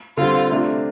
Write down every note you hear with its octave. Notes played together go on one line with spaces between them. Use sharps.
D3 G3 C4 F4
C3 A3 D4 F4